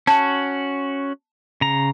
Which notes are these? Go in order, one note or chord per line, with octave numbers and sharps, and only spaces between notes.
C#4 F#4 A5
C#3 A#5